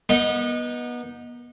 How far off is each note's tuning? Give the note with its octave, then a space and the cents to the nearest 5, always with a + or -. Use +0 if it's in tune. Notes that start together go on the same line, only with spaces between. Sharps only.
B3 -25 D#4 +0